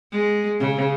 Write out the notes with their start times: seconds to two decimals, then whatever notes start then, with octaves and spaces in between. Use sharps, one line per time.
0.13 G#3
0.60 C#3